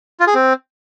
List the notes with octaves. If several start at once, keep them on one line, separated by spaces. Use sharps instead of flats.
F4
G#4
C4